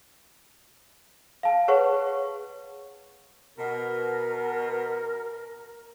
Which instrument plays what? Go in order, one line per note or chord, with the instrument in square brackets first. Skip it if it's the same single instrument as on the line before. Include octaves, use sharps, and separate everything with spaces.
[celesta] F5 A5
G#4 B4 C#5 F#5 C#6
[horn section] B2 [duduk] A#4